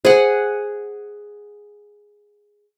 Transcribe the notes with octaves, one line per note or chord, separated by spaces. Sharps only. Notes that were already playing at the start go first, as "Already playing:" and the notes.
G#4 C5 F#5